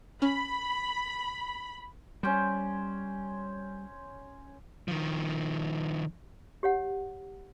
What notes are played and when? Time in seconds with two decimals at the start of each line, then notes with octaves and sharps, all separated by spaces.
0.22 C#4 B5
2.23 G3 C#4 C5
4.88 D#3 F3
6.63 G4 C#5 F#5